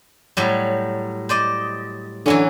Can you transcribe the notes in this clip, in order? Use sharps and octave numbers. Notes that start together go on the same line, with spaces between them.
A2 F#3 G3
C5 D5 D#5
D3 E3 F#3 C#4